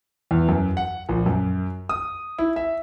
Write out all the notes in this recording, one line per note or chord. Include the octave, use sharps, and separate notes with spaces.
E2
F#2
F#5
A#1
F#2
D#6
E4
E5